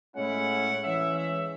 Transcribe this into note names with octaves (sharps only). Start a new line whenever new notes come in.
A2 G#3 C#4 E4 F#5
E3 G#3 C#4 E5
E5